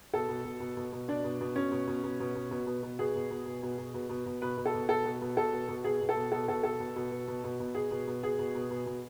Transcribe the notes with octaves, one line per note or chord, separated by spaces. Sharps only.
B2 A4
B2
B2
B2
B2
B2
B2 D4
B2
B2
B2 C#4
B2
B2
B2
B2
B2
B2
B2
B2
B2 G#4
B2
B2
B2
B2
B2
B2
B2
B2
B2 B4
B2
A4
B2
B2 A4
B2
B2
B2 A4
B2
B2
B2 G#4
B2
A4
B2
B2 A4
B2 A4
B2 A4
B2
B2
B2
B2
B2
B2
B2 G#4
B2
B2
B2 G#4
B2
B2
B2
B2